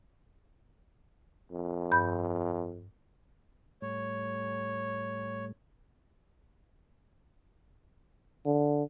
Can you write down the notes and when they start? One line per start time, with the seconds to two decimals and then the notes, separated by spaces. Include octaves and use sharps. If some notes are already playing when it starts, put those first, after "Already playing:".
1.52 F2
1.92 G2 B5 G6
3.82 A2 G3 A3 C#5
8.46 D3